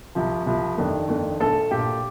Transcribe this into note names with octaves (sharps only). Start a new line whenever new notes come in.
C2 C3 F3
C2 C3 F3
F2 D#3 A3 D4
F2 D#3 A3 D4
A#1 A#2 A3 A4 A5
A#1 A#2 A3 G4 G5